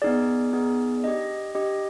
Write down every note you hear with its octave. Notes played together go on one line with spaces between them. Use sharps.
B3 D#4 G#4 D5
B3 D#4 G#4
D4 G4 D#5
D4 G4 D#5